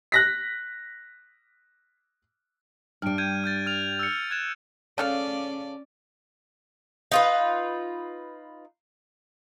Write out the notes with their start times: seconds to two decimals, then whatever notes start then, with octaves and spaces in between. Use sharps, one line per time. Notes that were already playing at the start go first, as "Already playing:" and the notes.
0.12 F#6 A#6 B6
3.02 G2 G3 F6 D7
3.18 G6 G#6 D#7
3.44 F6 G6 A6
3.66 F6 F7
3.99 E6 C#7
4.31 F#6 G#6 E7
4.98 C#3 C#4 A4 D5 F5
7.12 D#4 F4 B4